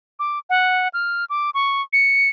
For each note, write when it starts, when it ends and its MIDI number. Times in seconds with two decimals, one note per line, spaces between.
0.19 0.39 86
0.50 0.88 78
0.94 1.25 89
1.30 1.50 86
1.54 1.82 85
1.93 2.29 97